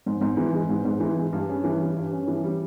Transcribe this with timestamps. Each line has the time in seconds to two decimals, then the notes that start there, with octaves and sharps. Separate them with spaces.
0.06 G#2
0.21 G#2
0.37 E3
0.54 G#3
0.69 G#2
0.85 G#2
1.00 E3
1.17 G#3
1.33 G2
1.49 C#4
1.64 E3
1.80 G3
1.96 G2
2.12 C#4
2.28 E3
2.43 G3